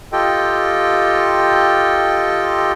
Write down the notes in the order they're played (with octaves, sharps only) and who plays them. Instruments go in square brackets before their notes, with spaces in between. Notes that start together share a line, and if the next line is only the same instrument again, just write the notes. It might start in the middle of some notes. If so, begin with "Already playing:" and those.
[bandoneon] F4 G4 A4 D#5 G5